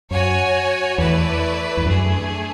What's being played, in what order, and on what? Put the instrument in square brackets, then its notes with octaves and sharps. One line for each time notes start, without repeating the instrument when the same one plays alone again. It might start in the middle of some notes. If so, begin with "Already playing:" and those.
[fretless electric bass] F#2 [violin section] F#4 C#5 G#5
[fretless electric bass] E2 [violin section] A3 E4 B4 D5
[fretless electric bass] E2
[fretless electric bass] F#2 [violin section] A3 D4 G#4